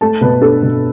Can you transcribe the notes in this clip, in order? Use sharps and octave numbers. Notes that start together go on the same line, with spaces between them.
A3 A5
B2 B4
D4 A4
B2